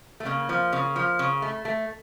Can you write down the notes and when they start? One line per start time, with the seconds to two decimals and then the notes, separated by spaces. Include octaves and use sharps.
0.20 A3
0.25 C#3 A#3
0.49 F3
0.72 C#3
0.96 F3
1.19 C#3
1.42 A3
1.65 A3